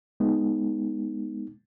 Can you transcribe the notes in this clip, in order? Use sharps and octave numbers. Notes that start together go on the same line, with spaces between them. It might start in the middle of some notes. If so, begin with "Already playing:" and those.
G#3 B3 D#4